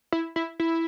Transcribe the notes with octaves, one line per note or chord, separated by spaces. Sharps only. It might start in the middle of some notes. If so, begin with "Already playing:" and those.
E4
E4
E4